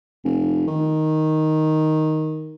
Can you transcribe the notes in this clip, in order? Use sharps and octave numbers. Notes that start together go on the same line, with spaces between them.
F1
D#3